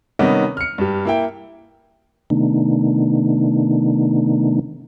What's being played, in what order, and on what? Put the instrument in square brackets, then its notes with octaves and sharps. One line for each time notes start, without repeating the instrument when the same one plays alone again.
[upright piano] C3 D#3 G3 B3 C#4 D#4
F6 C#7
G2 G4
A#3 E4 G5
[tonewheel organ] C3 D#3 A3 B3 D4 D#4